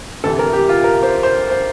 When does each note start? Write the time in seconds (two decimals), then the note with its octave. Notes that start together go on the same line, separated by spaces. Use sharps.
0.24 D2 C3 E3 A4
0.39 A#4
0.53 G4
0.69 F4
0.84 A#4
1.03 C5
1.23 C5
1.50 C5